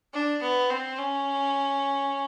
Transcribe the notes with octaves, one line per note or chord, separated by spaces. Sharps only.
D4
B3
C4
C#4